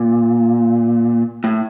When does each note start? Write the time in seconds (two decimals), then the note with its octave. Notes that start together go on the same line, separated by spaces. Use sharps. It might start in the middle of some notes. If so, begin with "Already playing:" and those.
Already playing: A#2
1.44 A2